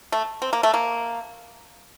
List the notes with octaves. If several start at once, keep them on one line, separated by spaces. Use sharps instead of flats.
A3
C4
A#3
A3
A#3